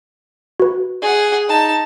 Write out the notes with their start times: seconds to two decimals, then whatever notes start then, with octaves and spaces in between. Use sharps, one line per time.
0.60 F#4 B4
1.02 G#4 F#5
1.49 D#4 A5